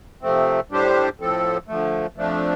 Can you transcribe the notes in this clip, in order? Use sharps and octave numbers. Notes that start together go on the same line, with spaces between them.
C3 F3 A3 C4
A2 G3 D4 G4 C5
A2 F3 C4 A4
D3 F3 A3
F2 F3 A3 D4